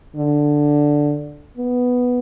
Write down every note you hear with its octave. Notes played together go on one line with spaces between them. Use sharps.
D3
B3